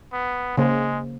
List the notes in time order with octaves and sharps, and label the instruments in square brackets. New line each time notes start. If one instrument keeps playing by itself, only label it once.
[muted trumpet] B3
[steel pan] C#3 A#3 C5 [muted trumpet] G#3